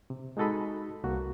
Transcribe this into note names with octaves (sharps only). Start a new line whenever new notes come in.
C3
G#3 D#4 F#4 A4 D#5 B5
C2 A#3 F#4